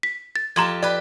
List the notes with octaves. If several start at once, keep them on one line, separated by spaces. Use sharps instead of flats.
B6
A6
F2 G4 A5 A#5 C6 G#6
G4 B4 D5